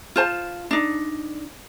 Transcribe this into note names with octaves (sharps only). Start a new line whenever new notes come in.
F4 C5 A5
D4 D#4